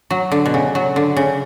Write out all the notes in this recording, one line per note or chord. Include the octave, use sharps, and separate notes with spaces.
F#3
D3
B2
C#3
F#3
D3
C#3